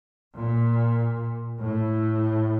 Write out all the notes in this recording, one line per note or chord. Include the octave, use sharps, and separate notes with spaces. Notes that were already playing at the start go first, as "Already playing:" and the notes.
A#2
A2